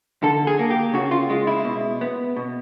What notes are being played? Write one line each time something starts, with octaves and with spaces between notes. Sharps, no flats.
D3 A4
G#4
A#3
G4
C#3 F#4
F4
G#3 F4
E4
B2
B3
B2